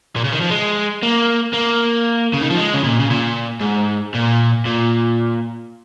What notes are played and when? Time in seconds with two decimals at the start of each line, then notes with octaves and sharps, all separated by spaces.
0.16 A#2
0.24 C#3
0.33 D#3
0.41 F3
0.50 G#3
1.03 A#3
1.54 A#3
2.33 C#3
2.41 D#3
2.50 F3
2.57 G#3
2.74 C#3
2.83 A#2
2.99 C#3
3.10 A#2
3.61 G#2
4.14 A#2
4.65 A#2